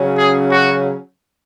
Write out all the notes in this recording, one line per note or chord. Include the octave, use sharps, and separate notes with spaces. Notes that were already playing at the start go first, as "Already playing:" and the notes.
Already playing: C#3 F#3 C#4
G#4
F#4